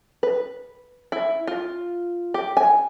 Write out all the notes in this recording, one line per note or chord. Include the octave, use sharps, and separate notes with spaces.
B4
E4
F4
G4
G#5